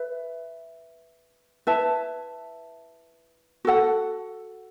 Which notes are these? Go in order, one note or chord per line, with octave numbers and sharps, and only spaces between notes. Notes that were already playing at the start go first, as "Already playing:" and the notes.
Already playing: B4 E5
E4 B4 E5 A5
F#4 A4 F#5